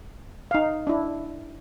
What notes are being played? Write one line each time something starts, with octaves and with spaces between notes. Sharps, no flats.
D#4 F5
D4 E4